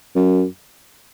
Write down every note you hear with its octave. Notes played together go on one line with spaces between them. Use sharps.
F#2